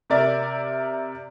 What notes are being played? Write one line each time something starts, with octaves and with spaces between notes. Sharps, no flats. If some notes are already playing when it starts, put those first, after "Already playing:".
C3 A#4 D5 E5